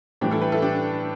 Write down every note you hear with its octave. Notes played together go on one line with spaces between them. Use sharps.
A2 E3 G3 D4 G4
E4 A4
G4 B4
E4 A4
D4 G4